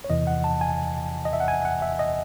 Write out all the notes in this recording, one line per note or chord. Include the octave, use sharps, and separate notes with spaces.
C#5
E2 C3 E3 D#5
F#5
A5
G#5
D#5
E5
F#5
G#5
F#5
E5
D#5